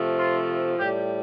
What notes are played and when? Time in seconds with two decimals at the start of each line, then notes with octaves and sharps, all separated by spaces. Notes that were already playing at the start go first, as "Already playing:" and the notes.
Already playing: C3 F3 A3
0.17 F4
0.77 A2 G3 G4